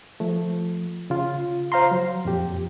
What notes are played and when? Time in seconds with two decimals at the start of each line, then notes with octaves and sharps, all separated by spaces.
0.20 F3 A3
1.10 C#3 F4
1.72 C5 F5 A#5 C6
1.91 F#3
2.25 F2 A#2 G4